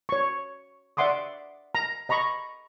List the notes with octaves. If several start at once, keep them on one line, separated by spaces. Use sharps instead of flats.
C#5 C#6
D5 E5 F#5 C6 D6 D#6
A#5
D#5 A#5 B5 C#6